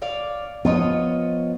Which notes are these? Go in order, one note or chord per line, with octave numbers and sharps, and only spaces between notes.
C#5 D5 F5
F3 B3 F4 C#5 D#5